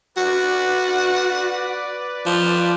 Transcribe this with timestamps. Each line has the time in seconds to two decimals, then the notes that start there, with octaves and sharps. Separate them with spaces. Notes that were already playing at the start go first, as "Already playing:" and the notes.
0.17 F#4 B4 D5
2.26 F3